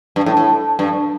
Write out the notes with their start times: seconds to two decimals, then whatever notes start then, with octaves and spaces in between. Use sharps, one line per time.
0.16 G2
0.26 A2
0.37 A2
0.79 G2